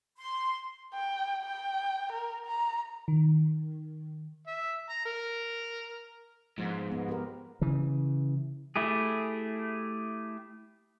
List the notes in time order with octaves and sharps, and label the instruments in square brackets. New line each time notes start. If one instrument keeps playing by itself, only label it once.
[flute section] C6
[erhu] G5
G5
A#4
A#5
[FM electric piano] D#3
[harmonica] E5
A#5
A#4
[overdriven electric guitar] G#2 [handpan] F3 G#3 B3
[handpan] B3
G4 A#4
[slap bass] C#3 E3
[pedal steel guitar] A3 E4 G4 G#4